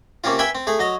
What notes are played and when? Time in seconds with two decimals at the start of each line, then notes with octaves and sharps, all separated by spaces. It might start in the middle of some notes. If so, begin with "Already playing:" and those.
0.24 C3 A#3 C4 C#4 F4
0.39 B4 E5 G5 G#5 B5
0.55 C4
0.67 A3 G#4
0.79 F#3 D#5 A#5